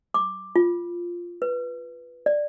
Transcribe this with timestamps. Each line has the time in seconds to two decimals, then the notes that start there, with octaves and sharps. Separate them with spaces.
0.14 D6
0.56 F4
1.42 B4
2.26 D5